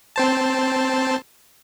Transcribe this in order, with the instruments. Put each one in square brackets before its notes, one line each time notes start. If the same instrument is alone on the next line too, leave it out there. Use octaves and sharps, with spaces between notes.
[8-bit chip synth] C4 C5 A5